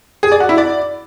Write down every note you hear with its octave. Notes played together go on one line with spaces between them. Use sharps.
G#4
D5
F#4
E4
D5